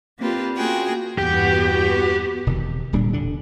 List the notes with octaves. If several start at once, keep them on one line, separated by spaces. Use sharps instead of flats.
A#3 C4 D4 F4 G4 B4
A#3 C#4 F4 F#4 G#4 G5
E2 G2 B3 F#4 G4
E1 C3 D#3
D1 A#2 G3 D4
E1 D3 D4